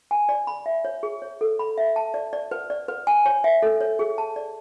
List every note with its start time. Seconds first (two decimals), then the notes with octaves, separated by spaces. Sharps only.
0.11 G#5
0.29 D5
0.47 B5
0.66 E5
0.85 C#5
1.03 G#4
1.22 C#5
1.41 A4
1.59 B5
1.78 E5
1.96 A5
2.14 D5
2.33 D5
2.51 B4
2.70 D5
2.88 B4
3.07 G#5
3.26 C#5
3.44 E5
3.62 A4
3.81 C#5
3.99 G#4
4.18 A5
4.36 D5